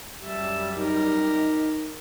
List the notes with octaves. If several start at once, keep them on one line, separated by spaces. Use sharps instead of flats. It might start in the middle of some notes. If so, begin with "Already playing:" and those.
F#2 G3 E5 A5
D#4 G4 A#4